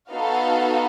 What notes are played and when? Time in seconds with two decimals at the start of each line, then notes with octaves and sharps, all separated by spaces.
0.11 B3 D#4 F#4 A4 F5